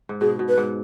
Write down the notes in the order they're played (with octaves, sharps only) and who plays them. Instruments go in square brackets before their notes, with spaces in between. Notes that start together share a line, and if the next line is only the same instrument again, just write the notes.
[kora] G#2
[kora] B2 [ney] G#4
[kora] B2
[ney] B4
[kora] G#2